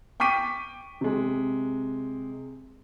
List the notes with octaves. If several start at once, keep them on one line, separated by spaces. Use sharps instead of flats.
G5 C#6 D6 B6 D#7
C3 G#3